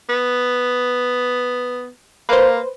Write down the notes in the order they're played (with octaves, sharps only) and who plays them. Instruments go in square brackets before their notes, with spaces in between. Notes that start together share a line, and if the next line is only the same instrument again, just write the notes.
[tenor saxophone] B3
[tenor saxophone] A#3 [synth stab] B4 C5